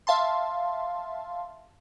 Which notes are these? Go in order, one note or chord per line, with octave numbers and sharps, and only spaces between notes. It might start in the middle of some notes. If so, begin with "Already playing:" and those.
E5 F5 A5 C6